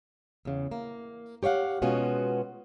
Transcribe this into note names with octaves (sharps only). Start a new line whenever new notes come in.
E2 C#3
A#3
G4 C#5 D5 F5 F#5
B2 G#3 B3 C#4 F4 F#4